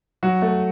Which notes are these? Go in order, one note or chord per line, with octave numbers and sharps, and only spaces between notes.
F#3 F#4
A3